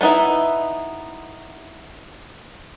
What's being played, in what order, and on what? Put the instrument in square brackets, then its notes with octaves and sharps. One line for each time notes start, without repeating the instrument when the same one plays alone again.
[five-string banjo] A3 B3 D#4 E4 E5